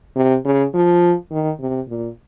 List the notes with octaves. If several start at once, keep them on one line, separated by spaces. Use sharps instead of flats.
C3
C#3
F3
D#3
C3
A#2